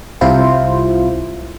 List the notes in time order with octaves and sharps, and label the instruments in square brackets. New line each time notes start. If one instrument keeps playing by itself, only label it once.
[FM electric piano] C2 C3 E4 F4 C5